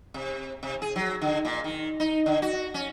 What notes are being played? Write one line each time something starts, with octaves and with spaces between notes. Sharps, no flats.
C3
C3
G#4
F#3
D3
A#2
D#3
D#4
D3
F#4
C#4